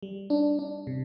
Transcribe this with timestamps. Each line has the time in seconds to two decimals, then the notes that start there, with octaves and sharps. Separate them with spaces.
0.03 G3
0.30 D4
0.59 D4
0.87 C3